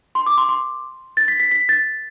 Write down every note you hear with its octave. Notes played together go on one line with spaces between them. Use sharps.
C6
D6
C6
C6
A6
B6
B6
B6
A6